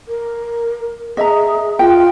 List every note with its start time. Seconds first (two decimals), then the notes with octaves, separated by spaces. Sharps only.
0.08 A#4
1.17 G#4 D#5 E5 A#5
1.79 F4 G5